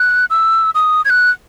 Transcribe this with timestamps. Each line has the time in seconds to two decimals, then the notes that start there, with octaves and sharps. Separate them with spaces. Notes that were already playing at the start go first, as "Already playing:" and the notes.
Already playing: F#6
0.30 E6
0.75 D#6
1.05 G#6
1.10 F#6